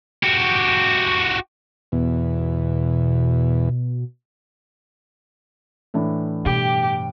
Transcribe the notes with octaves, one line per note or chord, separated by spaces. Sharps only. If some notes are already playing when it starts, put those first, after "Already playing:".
F#4 G4
E2 B2
A2 E3 D4
G2 B2 G4 G5